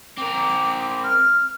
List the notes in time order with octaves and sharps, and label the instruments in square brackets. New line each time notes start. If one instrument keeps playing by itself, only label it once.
[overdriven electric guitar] C4 A#4 [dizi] D6
[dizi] F6